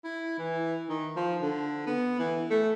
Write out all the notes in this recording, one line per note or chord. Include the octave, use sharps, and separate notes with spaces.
E4
E3
D#3
F3
D3
B3
E3
A3